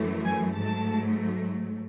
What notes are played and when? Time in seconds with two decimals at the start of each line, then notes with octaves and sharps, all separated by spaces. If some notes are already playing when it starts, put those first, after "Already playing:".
Already playing: F#2 E3 A3
0.25 G#5
0.56 G#2 F#3 A3 A5